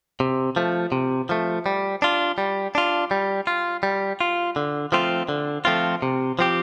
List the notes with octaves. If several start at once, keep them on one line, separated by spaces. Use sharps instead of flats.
C3
F3 A3
C3
F3 A3
G3
D4 F4
G3
D4 F4
G3
F4
G3
F4
D3
F3 A3 C4 F4
D3
F3 A3 C4 F4
C3
F3 C4 G4